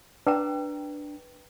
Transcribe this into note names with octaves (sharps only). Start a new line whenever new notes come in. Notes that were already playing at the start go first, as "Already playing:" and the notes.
D4 B4 G5 A#5